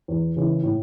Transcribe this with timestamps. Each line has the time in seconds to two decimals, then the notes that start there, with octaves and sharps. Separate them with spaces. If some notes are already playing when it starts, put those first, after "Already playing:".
0.08 E2
0.36 C#3 E3
0.63 A2